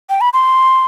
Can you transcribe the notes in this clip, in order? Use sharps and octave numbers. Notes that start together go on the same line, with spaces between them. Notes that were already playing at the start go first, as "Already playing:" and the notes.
G5
B5
C6